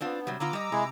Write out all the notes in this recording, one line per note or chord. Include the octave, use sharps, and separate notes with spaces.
B3 C4 D4 F4
C3 F#3 G3
D3 B3 F4 A#5 D6 E6
G3 D#5
C3 G#3 E4 G#4